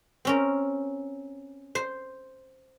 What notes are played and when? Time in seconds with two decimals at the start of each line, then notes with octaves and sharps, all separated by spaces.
0.25 C4 C#4 A#4
1.75 C5 C6